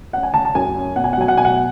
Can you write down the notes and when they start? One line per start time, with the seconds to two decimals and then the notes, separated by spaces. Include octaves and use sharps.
0.13 C#4 F#5
0.23 G#5
0.34 C#3 A5
0.45 A5
0.55 F#2 G#5
0.76 C#4
0.96 B2 F#5
1.04 G#5
1.13 F#5
1.17 F#3 G#5
1.28 F#5
1.37 B2 G#5
1.45 F#5